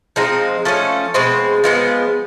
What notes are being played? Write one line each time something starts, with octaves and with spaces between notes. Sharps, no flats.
F3 G#3 C4 D#4
F3 A3 C#4
B2 G#3 C4
F3 G#3 B3